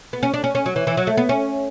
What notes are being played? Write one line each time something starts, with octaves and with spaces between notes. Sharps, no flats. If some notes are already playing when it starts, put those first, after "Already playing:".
B3
C#4
D4
C#4
C#4
F#3
E3
E3
F#3
A3
B3
C#4